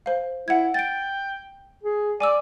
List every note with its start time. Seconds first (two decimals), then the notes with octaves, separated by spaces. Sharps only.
0.06 C5 F5
0.48 E4 F#5 G#6
0.74 G5 A6 D7
1.83 G#4
2.20 D5 G#5 D6 E6